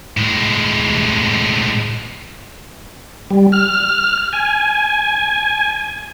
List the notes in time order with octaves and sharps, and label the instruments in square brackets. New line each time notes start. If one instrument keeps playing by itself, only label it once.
[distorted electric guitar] A2 G#3
[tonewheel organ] G3
F6
G#5